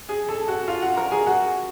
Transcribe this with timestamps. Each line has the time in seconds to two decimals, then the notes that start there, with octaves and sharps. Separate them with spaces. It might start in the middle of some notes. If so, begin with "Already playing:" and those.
0.09 G#4 G#5
0.29 A4 A5
0.48 F#4 F#5
0.68 F4 F5
0.82 F#4 F#5
0.97 A#4 A#5
1.11 G#4 G#5
1.27 F#4 F#5